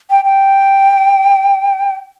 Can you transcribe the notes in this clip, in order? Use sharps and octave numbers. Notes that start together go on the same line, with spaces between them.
G5
G5